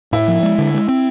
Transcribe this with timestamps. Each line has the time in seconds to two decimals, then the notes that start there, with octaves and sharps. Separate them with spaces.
0.12 A2 E4
0.28 F3
0.43 G#3
0.59 D3
0.74 G#3
0.89 C4